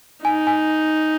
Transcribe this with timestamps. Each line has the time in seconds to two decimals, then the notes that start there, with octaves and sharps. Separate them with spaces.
0.24 D#4 G#5
0.47 G#5